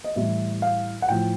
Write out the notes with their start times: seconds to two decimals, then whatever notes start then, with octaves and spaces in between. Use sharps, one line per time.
0.04 D#5
0.16 A2 E3 G3 E5
0.62 F5
1.02 F#5
1.09 A2 F3 G5